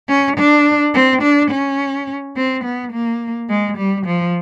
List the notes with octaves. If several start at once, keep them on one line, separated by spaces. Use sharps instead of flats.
C#4
D4
C4
D4
C#4
C4
B3
A#3
G#3
G3
F3